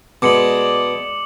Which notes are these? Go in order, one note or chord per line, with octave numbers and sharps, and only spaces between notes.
B2 G#3 D5 D6 C#7 F#7